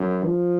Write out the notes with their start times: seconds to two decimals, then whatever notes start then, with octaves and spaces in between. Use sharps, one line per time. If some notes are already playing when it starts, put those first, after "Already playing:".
Already playing: F#2
0.25 F3